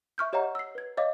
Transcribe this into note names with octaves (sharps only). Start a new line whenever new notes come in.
E5 C#6 F6 G6
G4 C#5 D#5 F#5 A#5
E6 C7
B4 G#6
C#5 D#5 F5 D6